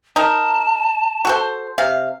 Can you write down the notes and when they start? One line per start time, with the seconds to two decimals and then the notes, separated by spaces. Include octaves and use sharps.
0.16 D#4 A#4 A5
1.25 F#4 A4 C5
1.78 C3 F5